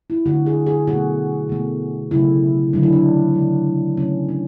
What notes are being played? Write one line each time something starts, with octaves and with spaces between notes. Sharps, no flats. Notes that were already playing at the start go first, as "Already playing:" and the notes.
E4
D3 A3 F#4
G#4
G#4
B2 A3 F#4
B2 A3
C#3 F#3 A3 E4
D3 F#3 A3 D4
E4
D4
C#3 G#3
C#3 F#3 A3 C#4
D4